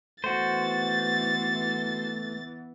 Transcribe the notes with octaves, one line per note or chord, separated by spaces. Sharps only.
E3 A3 B3 F#4 C5 A6